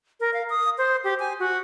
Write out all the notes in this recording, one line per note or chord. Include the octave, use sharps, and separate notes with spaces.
A#4
F5
D#6
C5
G4
G#5
F#4